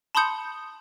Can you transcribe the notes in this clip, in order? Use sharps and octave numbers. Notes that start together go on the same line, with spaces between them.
A5 B5 C6 D#6 G6 C#7